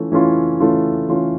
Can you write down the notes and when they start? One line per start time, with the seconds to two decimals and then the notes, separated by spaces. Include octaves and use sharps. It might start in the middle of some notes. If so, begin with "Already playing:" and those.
Already playing: E3 A3 C#4 F4
0.12 E3 A3 C#4 F4
0.60 E3 A3 C#4 F4
1.09 E3 A3 C#4 F4